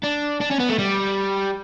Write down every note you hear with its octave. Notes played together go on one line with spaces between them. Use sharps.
D4
D4
C#4
B3
A3
G3